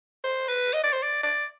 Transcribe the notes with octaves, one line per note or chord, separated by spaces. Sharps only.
C5
B4
D#5
D5
C5
D5
D5